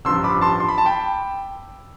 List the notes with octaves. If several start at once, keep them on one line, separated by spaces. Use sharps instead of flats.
A1 G2 F3 C6 E6
B5 D6
A5 C6
C6
B5
A5
G5 B5